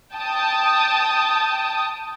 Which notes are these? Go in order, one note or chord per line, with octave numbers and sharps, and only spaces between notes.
G5 A5 D#6